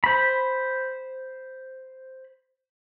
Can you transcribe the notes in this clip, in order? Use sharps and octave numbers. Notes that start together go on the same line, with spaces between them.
C5 B5